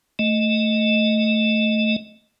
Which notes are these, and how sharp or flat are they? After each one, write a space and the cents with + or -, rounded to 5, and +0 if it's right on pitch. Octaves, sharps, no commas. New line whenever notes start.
A3 +0 D#5 +0